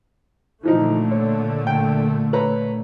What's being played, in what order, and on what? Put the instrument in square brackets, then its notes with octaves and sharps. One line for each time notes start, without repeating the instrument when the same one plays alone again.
[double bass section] A#2 D3 A3 [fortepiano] E3 F3 D#4
[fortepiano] C#5
G5
B4 C#5 A#5